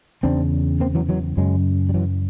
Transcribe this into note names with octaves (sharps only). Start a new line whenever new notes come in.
E2 C#3 C4 D4
A#3 C4
E3 F#3
E3 F#3
F#2 C#3 F#3 G#3
G3
E3 F#3